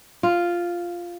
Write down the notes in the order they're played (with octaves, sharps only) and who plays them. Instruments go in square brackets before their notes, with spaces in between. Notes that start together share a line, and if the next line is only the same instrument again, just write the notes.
[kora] F4